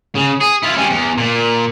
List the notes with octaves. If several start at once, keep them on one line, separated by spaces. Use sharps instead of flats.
C#3
G#4
E4 F4
G3 C#4
E2
A#2